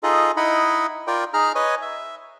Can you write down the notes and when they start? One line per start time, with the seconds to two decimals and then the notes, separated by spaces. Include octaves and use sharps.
0.03 D#4 F4 G#4 A4 D#5
0.37 D#4 E4 D#5 F#5 B5
1.07 F4 A#4 D5 G5
1.34 D#4 G#4 A#5 F6
1.55 B4 C#5 D#5 G#5
1.82 E5